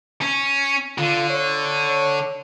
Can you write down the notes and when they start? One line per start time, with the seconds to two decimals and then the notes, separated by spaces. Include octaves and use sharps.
0.22 C#4
0.98 D3 F4
1.30 C#5